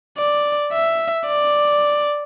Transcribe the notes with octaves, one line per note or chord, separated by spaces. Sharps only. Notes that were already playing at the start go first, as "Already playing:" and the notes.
D5
E5
D5